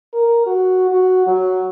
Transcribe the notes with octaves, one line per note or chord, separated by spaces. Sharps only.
A#4
F#4
F#4
F#3